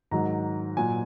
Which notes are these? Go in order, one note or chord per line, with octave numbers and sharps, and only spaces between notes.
G#2 D#3 F#3 A#5
A#2 F#3 G#5